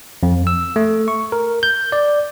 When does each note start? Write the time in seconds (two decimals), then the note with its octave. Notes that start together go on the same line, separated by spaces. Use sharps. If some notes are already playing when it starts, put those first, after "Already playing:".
0.23 F2
0.47 E6
0.76 A3
1.08 C#6
1.32 A#4
1.63 G6
1.92 D5